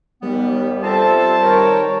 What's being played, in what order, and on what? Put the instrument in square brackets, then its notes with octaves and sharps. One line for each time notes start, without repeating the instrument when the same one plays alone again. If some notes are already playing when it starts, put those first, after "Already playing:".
[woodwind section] D#2 B3 [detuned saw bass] G3
[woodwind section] C4 F4 [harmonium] A4 E5 [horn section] C5 A5
[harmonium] D#3 C#5 G5 [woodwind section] A#4